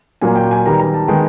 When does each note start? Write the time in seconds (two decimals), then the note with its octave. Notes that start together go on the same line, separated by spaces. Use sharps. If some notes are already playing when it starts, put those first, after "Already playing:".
0.21 A#2 F#3 A#3 G#5
0.36 G5
0.51 G#5
0.66 D#3 G3 B3 A#5
0.80 A#5
0.94 A5
1.08 D#3 G#3 B3 G5